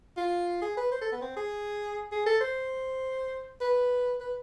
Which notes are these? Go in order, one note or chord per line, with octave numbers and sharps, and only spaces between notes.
F4
G#4
B4
C5
A4
B3
C4
G#4
G#4
A4
C5
B4
B4